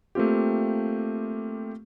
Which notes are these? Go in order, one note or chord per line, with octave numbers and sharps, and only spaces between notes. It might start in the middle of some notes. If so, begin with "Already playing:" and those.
A3 A#3 C4 F4 G4